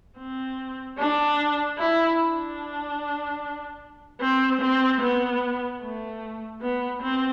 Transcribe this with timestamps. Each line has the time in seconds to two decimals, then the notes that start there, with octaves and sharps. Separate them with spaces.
0.18 C4
0.99 D4
1.78 E4
2.20 D4
4.21 C4
4.61 C4
5.01 B3
5.82 A3
6.62 B3
7.02 C4